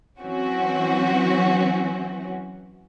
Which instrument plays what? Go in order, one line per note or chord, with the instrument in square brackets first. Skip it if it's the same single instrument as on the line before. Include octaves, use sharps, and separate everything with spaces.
[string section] E3 F#3 C4 C#4 F#4